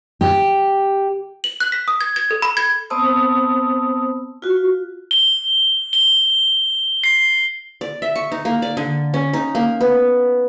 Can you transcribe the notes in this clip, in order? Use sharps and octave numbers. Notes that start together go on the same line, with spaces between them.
G4
F#7
F#6
B6
D#6
G#6
G#6
A4
B5
G#6
B3 C4 C5 A5 D#6 E6
F4 F#4
G7
G7
C7
D5
E5
C#6
D#4
A#3
D5
D3
C#4
D#4
A#3
B3